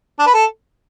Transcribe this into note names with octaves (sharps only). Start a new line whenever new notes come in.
D4
B4
A4